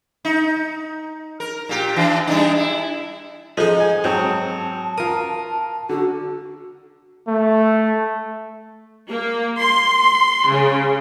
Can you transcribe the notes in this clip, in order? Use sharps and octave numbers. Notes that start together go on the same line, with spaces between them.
D#4
A#4
A#2 G4
E3 D4
G3 D4 D#4
E4
F3 G#3 D#4 G#4 A4 D#5
G#5
G#2 F#3 C4 G5 A5
F4 A#4 D#6
D3 F#4
A3
A#3
C6
C#3